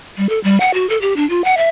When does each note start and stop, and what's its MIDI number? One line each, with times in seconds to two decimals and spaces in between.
0.17 0.29 55
0.29 0.39 69
0.44 0.58 55
0.60 0.71 78
0.74 0.88 66
0.89 1.00 69
1.01 1.14 67
1.16 1.28 62
1.30 1.44 65
1.44 1.57 78
1.57 1.69 76